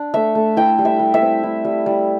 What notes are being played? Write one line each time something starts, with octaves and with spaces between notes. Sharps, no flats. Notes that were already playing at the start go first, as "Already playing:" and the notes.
Already playing: D4
A3 E5
A3
E4 G5
G3
E5
G3
E5
C4
E4
G3
G3